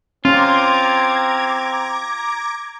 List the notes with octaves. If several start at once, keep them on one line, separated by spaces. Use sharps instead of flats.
C4 C#4 F4 A#5 D6 G#6